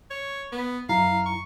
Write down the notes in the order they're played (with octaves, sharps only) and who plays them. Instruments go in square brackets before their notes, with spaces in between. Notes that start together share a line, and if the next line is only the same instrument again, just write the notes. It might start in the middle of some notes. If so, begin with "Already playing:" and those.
[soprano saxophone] C#5
B3
[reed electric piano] F#2 E4 A#5 [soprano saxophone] F5
[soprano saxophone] C#6